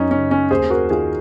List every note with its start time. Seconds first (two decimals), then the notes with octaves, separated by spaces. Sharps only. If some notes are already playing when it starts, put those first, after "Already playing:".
Already playing: F#2 C#4 D#4
0.11 C#3 C#4
0.31 C#4
0.51 D#2 G#4 C5
0.70 F#4 A#4
0.90 D#3 F4 G#4